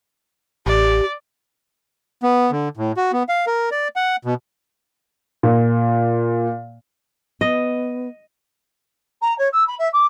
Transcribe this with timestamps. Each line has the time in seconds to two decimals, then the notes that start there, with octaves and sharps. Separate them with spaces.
0.66 A1 G4 D5
2.23 B3
2.51 D3
2.77 A2
2.97 F#4
3.13 B3
3.29 F5
3.47 A#4
3.71 D5
3.96 F#5
4.25 B2
5.43 A#2
7.41 B3 D#5
9.21 A#5
9.38 C#5
9.52 E6
9.67 B5
9.78 E5
9.93 D6